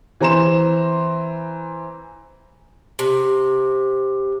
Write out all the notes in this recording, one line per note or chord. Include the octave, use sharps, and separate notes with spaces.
E3 C4 A#5 C6 E7
C3